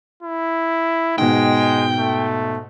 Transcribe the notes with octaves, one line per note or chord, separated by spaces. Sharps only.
E4
G#2 B2 G#3 G5
A3